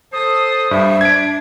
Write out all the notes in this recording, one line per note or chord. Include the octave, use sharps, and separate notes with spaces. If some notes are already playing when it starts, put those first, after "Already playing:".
A4 C5 D#6
G2 G3 E5
D4 G#6 D7